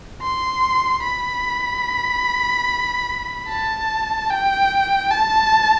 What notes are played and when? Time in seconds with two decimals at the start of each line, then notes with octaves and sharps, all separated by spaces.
0.23 C6
1.04 B5
3.49 A5
4.30 G5
5.10 A5